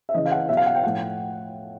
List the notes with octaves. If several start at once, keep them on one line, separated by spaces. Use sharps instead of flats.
E5
C#3 E3 D#5
F5
F#5
B2 F#3 E5
F5
F#5
G5
A2 F3 F#5